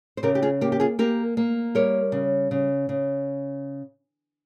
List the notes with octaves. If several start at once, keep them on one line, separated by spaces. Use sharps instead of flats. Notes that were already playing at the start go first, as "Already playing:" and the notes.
C5
C#3 G4 A#4
G4
F4 G#4
A#3 G4
G4
F4 G#4
A#3 G4 A#4
A#3
G3 A#4 C#5
C#3
C#3
C#3